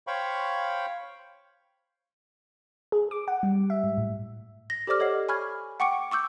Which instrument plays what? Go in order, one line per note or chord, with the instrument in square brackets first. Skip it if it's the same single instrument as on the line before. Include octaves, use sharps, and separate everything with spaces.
[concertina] C5 C#5 F5 G5 B5 C#6
[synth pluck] G#4
D6
F#5
G3
E5
G#2
A2
[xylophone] A#6
G4 A4 C5 D5 D6 F6
A4 C#5 D#5 F#5 C7
G#5 B5 C#6 F6 G#6
F#5 G5 C#6 D6 C#7 D7
C#6 D6 E6 G6